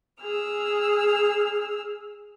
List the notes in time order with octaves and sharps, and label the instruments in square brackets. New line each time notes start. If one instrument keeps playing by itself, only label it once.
[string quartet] G#4 E6 F6